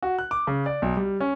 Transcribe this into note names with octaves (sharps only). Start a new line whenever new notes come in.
F#4
F#6
D6
C#3
D5
B1
G3
C#4